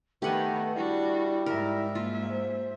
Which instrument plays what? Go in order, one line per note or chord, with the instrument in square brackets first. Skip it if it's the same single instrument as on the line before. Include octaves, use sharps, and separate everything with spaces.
[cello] D#3 B3 [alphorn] A3 [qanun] G4 F#5 G#5 [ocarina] B4
[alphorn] G3 [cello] D4 F#4 [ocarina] E4
[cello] G#2 E5 [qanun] A#4
[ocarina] A#3 [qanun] F4
[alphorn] C5